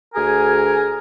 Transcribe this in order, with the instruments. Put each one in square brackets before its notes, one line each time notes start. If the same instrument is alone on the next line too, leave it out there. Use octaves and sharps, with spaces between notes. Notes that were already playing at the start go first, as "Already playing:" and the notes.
[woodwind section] D2 G#4 A#4 G#5